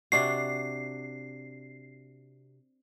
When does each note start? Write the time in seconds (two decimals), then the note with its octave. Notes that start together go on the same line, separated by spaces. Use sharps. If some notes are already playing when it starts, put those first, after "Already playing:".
0.12 C3 D4 F#4 C7